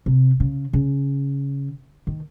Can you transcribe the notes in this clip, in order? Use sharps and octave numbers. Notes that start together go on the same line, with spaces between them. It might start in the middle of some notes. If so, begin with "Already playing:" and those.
C3
C#3
C#3
D#3